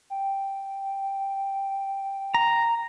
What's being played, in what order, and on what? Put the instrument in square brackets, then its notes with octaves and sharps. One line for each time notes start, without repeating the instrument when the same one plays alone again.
[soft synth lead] G5
[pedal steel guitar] A#5